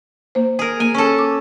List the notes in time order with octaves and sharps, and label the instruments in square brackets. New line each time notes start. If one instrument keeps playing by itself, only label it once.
[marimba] A#3 C5
[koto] G#4 A#4
[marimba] A#3 [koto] G#5
[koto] C#4 A4
[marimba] D6